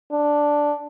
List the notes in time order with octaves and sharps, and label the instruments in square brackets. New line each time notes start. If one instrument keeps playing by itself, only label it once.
[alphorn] D4